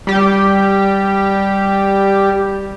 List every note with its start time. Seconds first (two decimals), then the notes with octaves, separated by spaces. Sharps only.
0.07 G3 G4